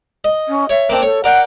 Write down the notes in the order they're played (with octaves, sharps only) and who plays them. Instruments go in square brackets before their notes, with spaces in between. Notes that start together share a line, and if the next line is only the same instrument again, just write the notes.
[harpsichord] D#5
[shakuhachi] C#4
[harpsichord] C#5 [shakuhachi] E5
[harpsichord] A#3 C4 D4
[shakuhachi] A4 [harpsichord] C#5
[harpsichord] A#4 D5 G5 [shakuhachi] F#5